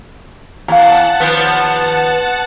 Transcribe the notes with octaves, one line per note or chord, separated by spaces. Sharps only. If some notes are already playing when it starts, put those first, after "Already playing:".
E2 F5 F#5 A5 A#5
D#2 F3 B3